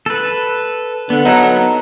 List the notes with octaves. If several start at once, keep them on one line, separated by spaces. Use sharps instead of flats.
A4 B4
D3 B3
F#3 D#4 A4 A#4